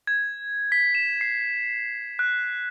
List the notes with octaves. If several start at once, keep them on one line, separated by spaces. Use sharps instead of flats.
G#6
B6
E7
C7
F#6